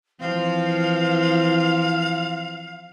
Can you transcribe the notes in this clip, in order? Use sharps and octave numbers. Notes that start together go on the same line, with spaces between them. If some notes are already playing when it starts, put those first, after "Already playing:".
E3 F3 C4 F5